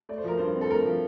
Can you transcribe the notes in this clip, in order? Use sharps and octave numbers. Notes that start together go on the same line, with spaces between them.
A3 D5
C5
F3 A#4
G2 C5
C4
A4
A3 A#4
F3